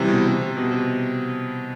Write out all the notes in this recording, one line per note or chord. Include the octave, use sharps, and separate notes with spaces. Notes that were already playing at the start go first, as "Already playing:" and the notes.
Already playing: C3 E3 G3
B2
C3
C3
B2
C3